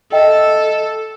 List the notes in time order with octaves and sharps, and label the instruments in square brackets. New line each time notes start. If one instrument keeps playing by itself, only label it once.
[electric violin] A4 [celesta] D#5 E5 G5